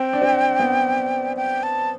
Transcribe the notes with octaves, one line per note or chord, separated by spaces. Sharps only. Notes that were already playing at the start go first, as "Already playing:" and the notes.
Already playing: C4 G5
D4
C4
B3
G5
A5